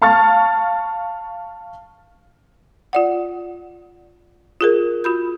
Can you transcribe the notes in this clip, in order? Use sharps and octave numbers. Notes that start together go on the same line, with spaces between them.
F5 A5 C#6 F6 A6
F4 D5 F#5
F4 G#4 A#4
F4 F#4 B5 G6